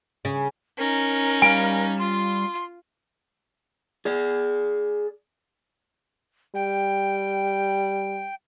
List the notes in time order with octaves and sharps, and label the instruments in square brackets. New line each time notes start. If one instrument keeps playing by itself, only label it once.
[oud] C#3
[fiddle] C#4 D#4 [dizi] A#4
[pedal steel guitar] G3 F5 [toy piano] G#5
[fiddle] F4 [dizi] C6
[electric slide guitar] G#4 D5
[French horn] G3 [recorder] G5